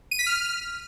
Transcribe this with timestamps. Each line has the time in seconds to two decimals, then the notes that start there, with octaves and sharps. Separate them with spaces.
0.11 D#7
0.19 B6
0.26 F6